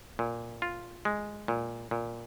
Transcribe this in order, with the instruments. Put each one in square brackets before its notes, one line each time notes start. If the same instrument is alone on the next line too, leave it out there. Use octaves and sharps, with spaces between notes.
[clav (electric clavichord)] A#2
F4
G#3
A#2
A#2